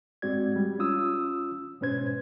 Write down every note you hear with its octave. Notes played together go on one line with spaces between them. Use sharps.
G#2 G#3 C4 F#4 D5 G#6
G3
C#4 F4 D#6 E6
G#2 B2 C#4 B4 C5 G#6